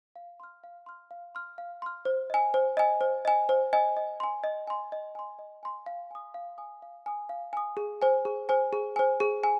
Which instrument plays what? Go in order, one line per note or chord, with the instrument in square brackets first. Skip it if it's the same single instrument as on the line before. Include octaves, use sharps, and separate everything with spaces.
[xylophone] F5
C6 F6
F5
C6 F6
F5
C6 F6
F5
C6 F6
C5
D#5 G#5
C5
D#5 G#5
C5
D#5 G#5
C5
D#5 G#5
D#5
G#5 C6
D#5
G#5 C6
D#5
G#5 C6
D#5
G#5 C6
F5
G#5 D#6
F5
G#5 D#6
F5
G#5 D#6
F5
G#5 D#6
G#4
C5 G#5
G#4
C5 G#5
G#4
C5 G#5
G#4
G#5